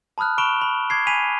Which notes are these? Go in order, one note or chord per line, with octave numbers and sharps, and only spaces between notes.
A5 B5 D#6 F6 F#6
B5 C#6 D7 E7 F7 G7
B5
D6 G#6 C7
G#5 B5 B6 D#7 F7